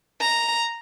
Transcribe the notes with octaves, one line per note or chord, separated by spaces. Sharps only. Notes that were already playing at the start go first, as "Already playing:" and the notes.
A#5